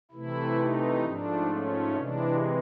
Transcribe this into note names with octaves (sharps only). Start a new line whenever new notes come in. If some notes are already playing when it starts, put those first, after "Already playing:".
C3 E3 A3 E4
D#4
G#2 F3 A3 D4
C#4
C3 E3 G#3 D4